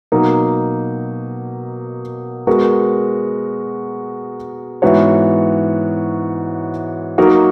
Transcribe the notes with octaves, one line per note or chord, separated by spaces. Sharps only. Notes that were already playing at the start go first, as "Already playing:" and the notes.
B2 F#3 A#3 D#4
G#3 B3 F#4 A#4
G#2 E3 B3 F#4 C#5
F#3 A#3 D#4 F#4 A#4